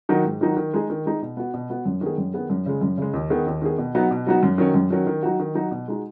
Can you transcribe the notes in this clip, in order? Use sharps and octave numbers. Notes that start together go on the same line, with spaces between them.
D#3 F#3 D#4 F#4
G#2
D#3 F#3 D#4 F#4
D#3
G#3 D#4 G#4
D#3
G#3 D#4 G#4
B2
B3 F#4
B2
B3 F#4
F#2
D#3 B3 G#4
F#2
D#3 B3 G#4
F#2
C#3 G#3
F#2
C#3 G#3
D#2
D#3 B3 G#4
D#2
D#3 B3 G#4
B2
F#3 B3 D#4 F#4
B2
F#3 B3 D#4 F#4
F#2
D#3 F#3 C#4
F#2
D#3 F#3 C#4
D#3
F#3 D#4 F#4
D#3
F#3 D#4 F#4
B2
G#3 D#4 F#4